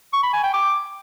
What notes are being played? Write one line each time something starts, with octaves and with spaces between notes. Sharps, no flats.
C#6
B5
G#5
G5
D6